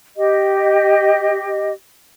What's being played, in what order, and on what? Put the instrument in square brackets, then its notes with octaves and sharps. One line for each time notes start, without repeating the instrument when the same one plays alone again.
[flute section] G4 D#5